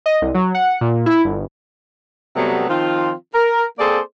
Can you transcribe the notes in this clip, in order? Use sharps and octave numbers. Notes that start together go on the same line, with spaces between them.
D#5
C2
F#3
F#5
A#2
E4
G1
C3 F#3 G3 A3 B3
D#3 F3 C4 F4
A#4
A#3 C4 G#4 A4 C5 D5